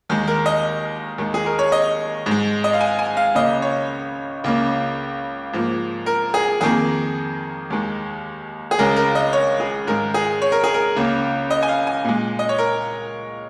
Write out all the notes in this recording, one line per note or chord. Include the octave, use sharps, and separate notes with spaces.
D#2 D#3 G#3
A#4
D#5
D#2 D#3 G#3
G#4
A#4
C#5
D#5
G#2
G#3
D#5
F5
G#5
G#5
F5
C#2 C#3 A#3 D#5
C#5
C#2 C#3 A#3
G#2 F3 A#3
A#4
G#4
F2 D#3 A#3 G#4
D#2 D#3 G#3
G#4
C#2 C#3 G#3 A#4
A#4
D#5
C#5
G#4
G#2 D#3 G#3 A#4
G#4
C#5
A#4
G#4
A#4
C#2 C#3 A#3
D#5
G#5
F5
G#5
A#2 G#3
D#5
C#5
A#4